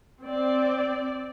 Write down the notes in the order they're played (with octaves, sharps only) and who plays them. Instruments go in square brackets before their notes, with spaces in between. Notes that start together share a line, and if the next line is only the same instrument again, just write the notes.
[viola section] C4 D5